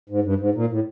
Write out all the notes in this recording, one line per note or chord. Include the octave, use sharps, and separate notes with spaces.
G#2
G2
G#2
A#2
A2